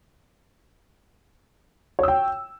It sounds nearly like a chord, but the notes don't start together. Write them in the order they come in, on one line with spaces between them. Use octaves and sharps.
C#5 E6 G5